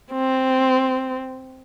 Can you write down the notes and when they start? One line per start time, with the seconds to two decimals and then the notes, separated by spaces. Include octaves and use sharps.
0.12 C4